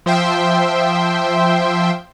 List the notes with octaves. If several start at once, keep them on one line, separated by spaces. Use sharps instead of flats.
F3 C5 E5 G5 C6